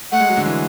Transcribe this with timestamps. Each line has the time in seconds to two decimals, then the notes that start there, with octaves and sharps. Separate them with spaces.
0.12 A3 F#5
0.20 G#3
0.28 F#3
0.37 D3
0.45 E3